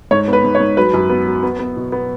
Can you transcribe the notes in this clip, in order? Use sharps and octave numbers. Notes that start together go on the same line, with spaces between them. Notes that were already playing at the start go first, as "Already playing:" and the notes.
G#2 C#5
B3
B4
G#2
C#5
G#2
F#3 B4
F#2
B3
F#3
B3
B3
B2
B3